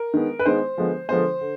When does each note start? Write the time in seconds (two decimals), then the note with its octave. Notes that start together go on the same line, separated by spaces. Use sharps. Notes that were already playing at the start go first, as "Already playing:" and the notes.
Already playing: A#4
0.14 D#3 G#3 B3
0.39 B4
0.46 D#3 G#3 B3 C5
0.77 D3 F3 G#3 B3
1.09 D3 F3 G#3 B3 C5
1.41 D3